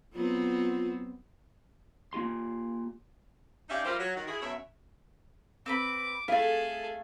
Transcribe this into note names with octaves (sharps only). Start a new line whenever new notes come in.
F#3 B3 C4 F4
A#3 F4 G4 C6
C#4 D#4 G4 D5 E5 F5
F3 G3 F4 G4 A#4 C5
F#3
D#3 F#4
E4 G#4
F#2 B2 C#5 E5
C4 B4 B5 D6
A3 B3 G#4 A4 F5